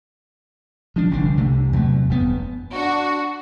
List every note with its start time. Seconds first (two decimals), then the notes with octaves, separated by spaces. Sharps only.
0.96 F3 D4
1.11 G1 C2 D3 D4
1.37 C2 C3 A3
1.73 E2 C3 F#3 A3
2.09 F1 G2 C3 B3
2.75 D4 F#4